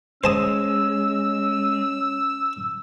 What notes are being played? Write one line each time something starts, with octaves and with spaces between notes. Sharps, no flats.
G#3 C#4 C5 A5 D#6 E6